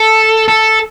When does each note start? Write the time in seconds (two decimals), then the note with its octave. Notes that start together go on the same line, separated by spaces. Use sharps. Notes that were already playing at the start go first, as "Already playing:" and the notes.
Already playing: A4
0.48 A4